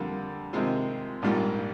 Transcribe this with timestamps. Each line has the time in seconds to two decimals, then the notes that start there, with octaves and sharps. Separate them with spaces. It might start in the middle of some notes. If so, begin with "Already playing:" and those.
Already playing: F2 D3 G3 A#3
0.53 C3 D#3 G#3 C4 F4
1.22 A#1 G#2 G3 A#3 F4